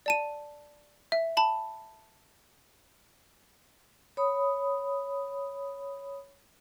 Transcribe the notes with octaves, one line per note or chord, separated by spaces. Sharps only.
D5 A5 D#7
E5
A5 B5
C#5 B5 D#6